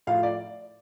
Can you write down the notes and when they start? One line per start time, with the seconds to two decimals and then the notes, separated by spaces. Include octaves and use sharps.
0.07 A2 F3 F5
0.23 D5